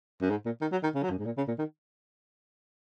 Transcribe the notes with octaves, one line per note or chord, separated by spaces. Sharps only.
F#2
G#2
A#2
D#3
F#3
D#3
C#3
F#3
F#2
G#2
A#2
C#3
A#2
D#3